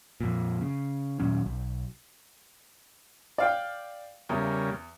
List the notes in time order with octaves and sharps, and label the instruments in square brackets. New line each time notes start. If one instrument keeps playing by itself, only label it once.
[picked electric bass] F2 A#2
C#3
D#2 A#2 F#3 C#4
B1
[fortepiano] D5 F5 G5
[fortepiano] E2 [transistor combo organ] C#3 G3 A#3